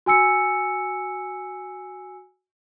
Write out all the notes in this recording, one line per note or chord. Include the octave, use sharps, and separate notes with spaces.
F#4 G#5 E6 C#7